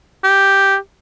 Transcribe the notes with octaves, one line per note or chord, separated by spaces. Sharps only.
G4